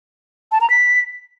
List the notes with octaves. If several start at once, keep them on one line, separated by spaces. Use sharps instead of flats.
A5
A#5
B6